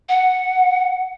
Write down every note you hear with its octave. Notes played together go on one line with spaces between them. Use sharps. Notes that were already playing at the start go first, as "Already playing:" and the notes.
F#5